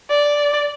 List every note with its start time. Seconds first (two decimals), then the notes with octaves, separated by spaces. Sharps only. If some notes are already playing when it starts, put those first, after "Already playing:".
0.10 D5